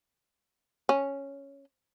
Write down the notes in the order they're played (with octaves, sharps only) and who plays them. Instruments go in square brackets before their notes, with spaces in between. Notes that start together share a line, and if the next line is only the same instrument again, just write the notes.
[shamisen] C#4